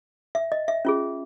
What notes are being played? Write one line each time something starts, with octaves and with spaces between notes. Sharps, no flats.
E5
D#5
E5
C#4 F4 G#4